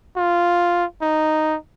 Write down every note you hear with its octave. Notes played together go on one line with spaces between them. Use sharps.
F4
D#4